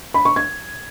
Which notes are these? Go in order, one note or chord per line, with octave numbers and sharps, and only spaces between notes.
B5
C#6
G#6